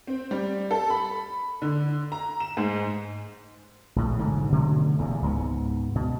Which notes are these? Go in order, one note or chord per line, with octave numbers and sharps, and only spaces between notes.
C4
G3
A4
B5
D3
A#5
E7
G#2
A#1 A2
B1 G#2 D3
B2 D3 F#3 A3
D#1 E2 C3
C#2 G#2 B3
B2